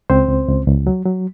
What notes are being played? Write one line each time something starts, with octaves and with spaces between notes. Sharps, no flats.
C#2 C4 C5
C#2
C#2
C#2
F#3
F#3